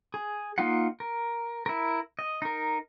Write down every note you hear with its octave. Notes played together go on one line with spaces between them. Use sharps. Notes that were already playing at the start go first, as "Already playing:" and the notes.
G#4
A#3 D#4 F4 F5 F#5
A#4
E4 A#4
D#5
D#4 A#4